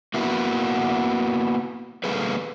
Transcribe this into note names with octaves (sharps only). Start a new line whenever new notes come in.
A#3 B3 E4 F#4
G3 A3 A#3 G#4 B4